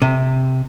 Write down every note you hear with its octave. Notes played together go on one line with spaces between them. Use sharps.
C3